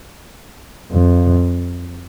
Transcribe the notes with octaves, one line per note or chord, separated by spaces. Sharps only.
F2